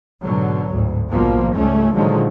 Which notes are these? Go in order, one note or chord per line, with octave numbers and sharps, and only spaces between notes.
G#1 B2 D3 F#3
G#1 D2 A2
A#1 B2 F3 G3 A#3
C#2 G#2 G3 A3 C#4
A#2 D3 D#3 F3 F#3 G#3